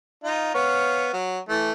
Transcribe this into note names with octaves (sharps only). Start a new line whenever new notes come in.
D#4 F4
B3 C#5 F5
F#3
E3 A3